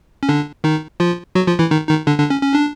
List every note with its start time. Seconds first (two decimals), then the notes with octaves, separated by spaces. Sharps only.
0.23 C#4
0.29 D3 D4
0.64 D#3 D#4
1.00 F3 F4
1.35 F#3 F#4
1.47 F3 F4
1.59 E3 E4
1.71 D#3 D#4
1.89 D#3 D#4
2.07 D3 D4
2.18 D3 D4
2.30 C#4
2.43 C#4
2.54 D4